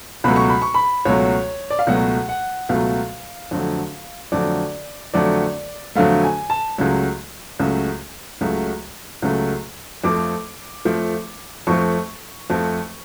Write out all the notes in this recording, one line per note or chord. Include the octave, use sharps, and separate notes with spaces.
C#2 B2 F#3 A3 B5
C#6
B5
C#6
B5
C#2 B2 F#3 A3 C#5
D5
F5
C#2 B2 F#3 A3 F#5
F#5
C#2 B2 F#3 A3 F5
F2 D3 F#3 A3
F2 D3 F#3 A3 D5
F2 D3 F#3 A3 D5
F2 D3 F#3 A3 F5
G#5
A5
C#2 C#3 F#3 A3
C#2 C#3 F#3 A3
C#2 C#3 F#3 A3
C#2 C#3 F#3 A3
F2 F3 A3 D6
F2 F3 A3
F2 F3 A3 C#6
F2 F3 A3